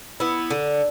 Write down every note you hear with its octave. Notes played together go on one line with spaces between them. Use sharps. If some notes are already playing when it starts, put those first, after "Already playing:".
B3 E4
D3